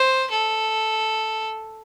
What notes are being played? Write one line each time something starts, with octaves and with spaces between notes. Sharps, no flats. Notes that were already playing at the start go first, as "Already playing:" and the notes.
Already playing: C5
A4